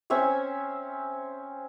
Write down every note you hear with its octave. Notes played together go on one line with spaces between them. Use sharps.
C4 C#4 E5 G#5